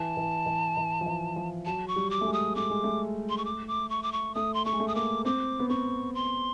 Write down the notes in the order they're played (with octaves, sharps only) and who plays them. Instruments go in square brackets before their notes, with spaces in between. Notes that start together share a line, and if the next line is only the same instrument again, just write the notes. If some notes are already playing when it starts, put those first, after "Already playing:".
Already playing: [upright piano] E3 [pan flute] A5
[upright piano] E3
E3
E3
F3
E3
F3
[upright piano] F#3 [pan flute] A5
[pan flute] C#6
[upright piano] G3
[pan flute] D6
[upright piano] A3
G#3
[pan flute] D#6
[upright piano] A3 [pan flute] D6
[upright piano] G#3
A3
[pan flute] C6
C#6
D6
D6
C#6
D6
C#6
[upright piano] A3 [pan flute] D#6
[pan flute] C6
[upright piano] A3 [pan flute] C#6
[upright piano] G#3
A3
[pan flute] D#6
[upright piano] A#3 [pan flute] D6
[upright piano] C4 [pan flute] D6
[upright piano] B3
[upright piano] C4 [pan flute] C#6
[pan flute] C6